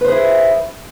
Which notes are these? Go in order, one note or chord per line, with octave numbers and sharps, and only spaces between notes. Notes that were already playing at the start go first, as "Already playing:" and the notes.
E4 G#4 B4 C5